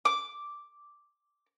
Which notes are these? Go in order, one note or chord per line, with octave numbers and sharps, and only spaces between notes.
D6